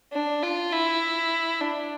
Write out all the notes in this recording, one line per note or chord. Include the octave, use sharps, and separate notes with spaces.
D4
F4
E4
D4